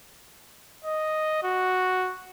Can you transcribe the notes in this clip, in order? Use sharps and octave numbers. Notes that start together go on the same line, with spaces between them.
D#5
F#4